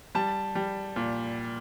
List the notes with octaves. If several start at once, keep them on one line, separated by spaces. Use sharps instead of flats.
G3 A5
G3
A#2